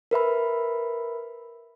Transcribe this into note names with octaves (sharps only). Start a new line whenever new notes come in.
A#4 B4 E5 B5